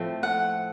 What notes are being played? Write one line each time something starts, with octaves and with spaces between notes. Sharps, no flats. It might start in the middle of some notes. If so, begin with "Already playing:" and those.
Already playing: A2 F3 A3 C4
F#5